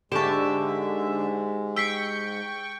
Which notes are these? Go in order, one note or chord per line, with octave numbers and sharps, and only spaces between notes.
G#2 D3 G#3 G4 E5 A5 C#6 E7
G5 C#6 E6 B6 C7